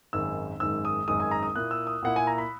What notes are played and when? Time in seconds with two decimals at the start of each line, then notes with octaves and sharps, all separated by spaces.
0.13 G#1 F#2 D#3 G#3 E6
0.60 G#1 F#2 D#3 G#3 E6
0.85 D#6
1.08 G#1 F#2 D#3 G#3 D#6
1.20 G#5
1.31 A#5
1.43 D#6
1.55 A#2 A#3 E4 F#6
1.71 E6
1.87 D#6
2.02 A#2 A#3 E4 F#5
2.16 G#5
2.27 A#5
2.38 B5